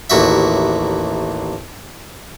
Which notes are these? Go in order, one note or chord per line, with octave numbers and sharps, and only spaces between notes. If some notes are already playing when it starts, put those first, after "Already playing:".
A1 D#2 F#4 E5